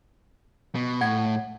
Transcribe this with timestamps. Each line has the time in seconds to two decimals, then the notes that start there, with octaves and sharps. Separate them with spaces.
0.75 B2
1.01 A2 F#5 G#6